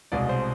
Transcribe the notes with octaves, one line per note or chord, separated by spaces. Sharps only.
C2 B2 G#3 D5
C5